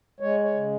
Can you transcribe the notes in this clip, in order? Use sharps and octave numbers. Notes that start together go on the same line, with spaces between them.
G#3 C#5
C#5
C#3